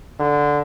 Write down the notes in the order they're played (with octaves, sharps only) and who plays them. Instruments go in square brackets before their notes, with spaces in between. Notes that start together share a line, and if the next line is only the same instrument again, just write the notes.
[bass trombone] D3